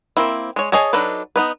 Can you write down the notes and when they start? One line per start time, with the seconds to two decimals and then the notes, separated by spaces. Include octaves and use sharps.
0.17 A#3 C4 E4
0.56 G#3 C#5
0.72 G#4 C#5 D#5 G#5 A5
0.93 F#3 D4 D#4 A4 B4
1.36 B3 D#4 B4